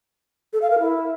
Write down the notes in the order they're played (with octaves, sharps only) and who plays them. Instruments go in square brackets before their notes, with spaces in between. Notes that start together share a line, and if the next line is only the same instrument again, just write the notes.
[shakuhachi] A4
F5
A#4
E4